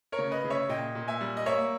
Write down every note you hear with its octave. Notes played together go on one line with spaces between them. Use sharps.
A#4 C#5
C#3
B4 D#5
C#3
C#5 E5
A#2 D#5 G5
A#2
E5 G#5
G3
D#5
A#3 C#5 E5